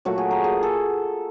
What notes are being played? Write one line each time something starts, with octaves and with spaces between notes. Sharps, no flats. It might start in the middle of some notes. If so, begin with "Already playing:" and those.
A#2 F#3 A3 F#4
G#4
A#4
G#4
A4